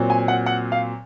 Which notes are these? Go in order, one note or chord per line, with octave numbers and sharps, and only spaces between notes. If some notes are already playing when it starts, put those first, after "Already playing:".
Already playing: A#2 F#3 C4
G#5
F#5
F#5
F5